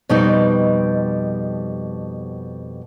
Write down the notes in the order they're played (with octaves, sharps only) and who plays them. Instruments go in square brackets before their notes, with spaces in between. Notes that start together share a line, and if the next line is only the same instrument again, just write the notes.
[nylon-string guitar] F2 B2 G3 B3 D#4